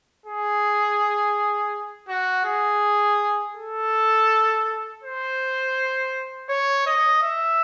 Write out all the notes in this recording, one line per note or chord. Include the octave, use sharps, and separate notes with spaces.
G#4
F#4
G#4
A4
C5
C#5
D#5
E5